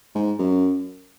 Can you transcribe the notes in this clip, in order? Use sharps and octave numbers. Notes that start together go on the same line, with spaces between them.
G#2
F#2